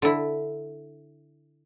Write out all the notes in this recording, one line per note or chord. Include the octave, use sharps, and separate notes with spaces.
D3 E4